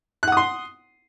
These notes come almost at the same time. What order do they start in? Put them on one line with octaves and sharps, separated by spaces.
F#6 F#5 D#6 C6